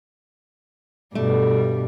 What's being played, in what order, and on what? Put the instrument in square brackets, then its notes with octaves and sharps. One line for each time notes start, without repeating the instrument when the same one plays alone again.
[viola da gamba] G2 B2 G3 [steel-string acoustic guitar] A3